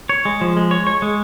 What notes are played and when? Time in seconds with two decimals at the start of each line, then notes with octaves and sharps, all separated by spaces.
0.09 C#5
0.25 G#3
0.41 F3
0.57 G#3
0.71 C#5
0.87 C#5
1.02 G#3